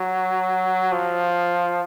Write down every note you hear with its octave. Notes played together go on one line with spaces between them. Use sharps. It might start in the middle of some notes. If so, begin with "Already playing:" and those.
Already playing: F#3
F3